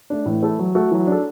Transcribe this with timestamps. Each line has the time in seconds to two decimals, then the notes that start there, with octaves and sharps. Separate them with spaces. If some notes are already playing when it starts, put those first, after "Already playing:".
0.10 A3 D4
0.26 A2 E3
0.43 A3 E4 A4
0.59 F#3
0.75 A3 F#4 A4
0.91 E3 F#3
1.07 D4 A4